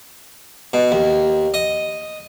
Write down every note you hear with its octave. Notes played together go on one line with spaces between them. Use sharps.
B2
D#2
D#5